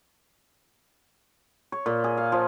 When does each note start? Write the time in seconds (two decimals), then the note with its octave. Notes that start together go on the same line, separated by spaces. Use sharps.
1.72 C#5
1.86 A#2
2.04 G#4
2.17 F5
2.32 F3